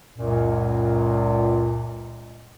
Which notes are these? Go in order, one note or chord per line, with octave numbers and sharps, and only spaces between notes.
C#2 F#2 A#2